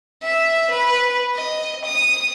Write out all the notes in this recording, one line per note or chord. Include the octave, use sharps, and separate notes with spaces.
E5
B4
D#5
D#6